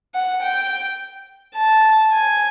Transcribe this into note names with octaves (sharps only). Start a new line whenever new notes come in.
F#5
G5
A5
G#5